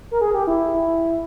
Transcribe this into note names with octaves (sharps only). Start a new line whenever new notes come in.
A#4
G#4
G4
E4